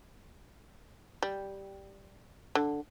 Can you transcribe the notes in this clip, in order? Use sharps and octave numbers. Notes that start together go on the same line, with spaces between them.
G3
D3